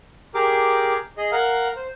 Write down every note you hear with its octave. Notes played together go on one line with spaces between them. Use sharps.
G4 G#4 A#4 D6
G#4 D#5
A#4 F5 F#5
C5